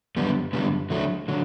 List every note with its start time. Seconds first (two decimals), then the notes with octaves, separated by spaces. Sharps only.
0.17 F#2 D3 G3 B3
0.53 F#2 D3 G3 B3
0.90 D3 F#3 A3
1.28 D3 F#3